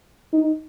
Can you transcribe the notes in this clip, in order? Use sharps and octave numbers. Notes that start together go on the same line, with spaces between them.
D#4